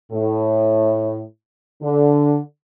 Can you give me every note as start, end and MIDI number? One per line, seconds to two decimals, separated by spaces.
0.12 1.21 45
1.83 2.39 50